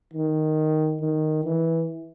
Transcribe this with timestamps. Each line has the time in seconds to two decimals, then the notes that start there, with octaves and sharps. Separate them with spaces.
0.14 D#3
1.02 D#3
1.45 E3